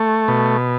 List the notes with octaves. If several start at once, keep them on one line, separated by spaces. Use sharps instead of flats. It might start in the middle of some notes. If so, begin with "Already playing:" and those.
Already playing: A3
B2